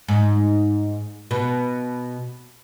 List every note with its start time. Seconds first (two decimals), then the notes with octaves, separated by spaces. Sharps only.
0.08 G#2
1.31 B2